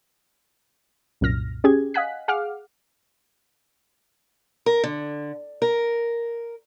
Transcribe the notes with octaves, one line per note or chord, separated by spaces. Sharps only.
C2 F#2 A#2 F6 A#6
C#4 G4 G#4 G#6
D#5 F5 F#5 G#5 F#6 B6
G#4 F5 F#5 D6 F6
A#4
D3
A#4